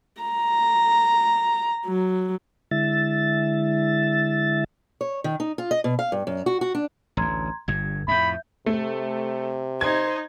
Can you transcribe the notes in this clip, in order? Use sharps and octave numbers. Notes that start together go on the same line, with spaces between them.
A#5
F#3
D3 G#3 E4 E5 A6
C#5
D#3
D#4
F4
D#5
B2
F5
G2
F#2
F#4
F#4
D4
A1 D2 A#5 C6 G#6
G1 G2 G#6
F2 A2 E5 B5 G6
C3 A3
D#4 C5 G#6